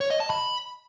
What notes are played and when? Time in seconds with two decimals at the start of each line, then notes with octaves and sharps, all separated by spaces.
0.01 C#5
0.10 D#5
0.20 A5
0.30 B5